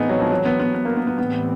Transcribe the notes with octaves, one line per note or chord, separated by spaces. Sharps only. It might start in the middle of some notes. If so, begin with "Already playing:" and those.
Already playing: A2 E3 A3 B3 C4 D#4 G#4
F#3
F3
F#3
B3
B3
B3
A#3
B3
B3
A2 E3 G3 B3 C4